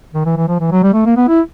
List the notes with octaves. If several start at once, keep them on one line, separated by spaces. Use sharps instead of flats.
D#3
E3
E3
F3
E3
F#3
G3
A3
A#3
B3
E4